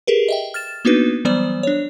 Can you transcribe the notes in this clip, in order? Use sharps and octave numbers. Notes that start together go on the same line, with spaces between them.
G4 G#4 A#4 B4
D#5 E5 G5
F6 A6 E7
A#3 B3 D4 D#4 F#4 B4
E3 F#3 G3 B3 C5 D5
D4 C#5